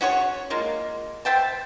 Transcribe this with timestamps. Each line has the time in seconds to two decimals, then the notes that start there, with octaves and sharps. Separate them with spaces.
0.01 C#4 F#4 G#4 C#5
0.50 G#3 A#3 F4
1.25 C5 E5 G5 A5